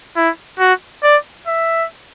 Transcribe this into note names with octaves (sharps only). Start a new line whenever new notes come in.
E4
F#4
D5
E5